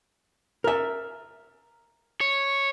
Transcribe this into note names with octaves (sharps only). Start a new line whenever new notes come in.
A#4 E5
C#5